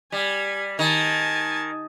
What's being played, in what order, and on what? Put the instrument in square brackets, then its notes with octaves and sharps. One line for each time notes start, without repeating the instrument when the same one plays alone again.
[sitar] G3 [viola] G#5
[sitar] D#3 [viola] G#5 A5